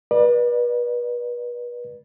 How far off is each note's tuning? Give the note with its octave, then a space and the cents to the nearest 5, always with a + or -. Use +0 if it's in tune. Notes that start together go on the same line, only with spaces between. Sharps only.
B4 -35 D5 +30